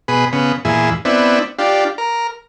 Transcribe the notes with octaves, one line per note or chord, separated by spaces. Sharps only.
B2 G#4 B4
C#3 B3
E2 A#2 E4 G#4
B3 C4 D4 E4
D4 F4 G4
A#4